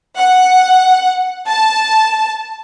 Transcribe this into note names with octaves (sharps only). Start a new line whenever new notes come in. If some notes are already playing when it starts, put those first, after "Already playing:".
F#5
A5